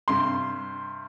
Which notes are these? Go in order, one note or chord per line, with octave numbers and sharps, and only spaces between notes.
G2 C3 C6